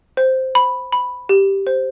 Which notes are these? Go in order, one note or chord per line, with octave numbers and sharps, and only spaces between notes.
C5
B5
B5
G4
C5